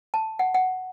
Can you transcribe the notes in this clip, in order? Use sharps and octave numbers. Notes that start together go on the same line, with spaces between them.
A5
F#5
F#5